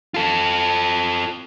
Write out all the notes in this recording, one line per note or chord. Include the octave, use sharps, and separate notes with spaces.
F4 A4